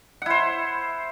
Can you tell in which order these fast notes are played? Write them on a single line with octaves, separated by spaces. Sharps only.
F#5 E4 C5